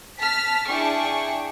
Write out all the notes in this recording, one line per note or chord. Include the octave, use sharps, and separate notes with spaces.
A5 F6 B6
D4 E4 G#4 G5 C#6